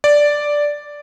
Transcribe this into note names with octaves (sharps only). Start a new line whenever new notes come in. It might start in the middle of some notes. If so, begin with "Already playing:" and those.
D5